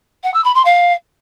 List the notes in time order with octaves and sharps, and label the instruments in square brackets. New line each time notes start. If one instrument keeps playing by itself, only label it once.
[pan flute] F#5
E6
B5
C6
F5